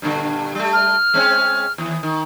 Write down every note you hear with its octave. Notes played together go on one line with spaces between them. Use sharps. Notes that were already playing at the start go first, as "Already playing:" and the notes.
G2 A#2 D3
G3 A3
F6
G#3 C4 C#4
D#2 E3
D#3